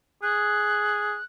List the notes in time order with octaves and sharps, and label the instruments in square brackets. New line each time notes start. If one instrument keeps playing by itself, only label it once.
[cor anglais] G#4 [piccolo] F#6